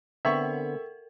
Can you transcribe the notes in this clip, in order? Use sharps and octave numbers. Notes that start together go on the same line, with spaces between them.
D3 B3 C4 A4 A#4 E5 C#6